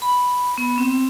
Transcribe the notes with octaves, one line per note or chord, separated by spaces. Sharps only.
B5
B3
C4